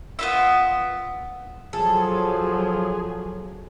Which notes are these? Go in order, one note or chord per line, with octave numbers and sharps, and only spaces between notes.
B3 F4 E5
F3 F#3 G#4 A4